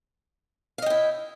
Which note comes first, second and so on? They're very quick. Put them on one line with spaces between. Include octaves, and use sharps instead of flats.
F5 D#5 G5 E4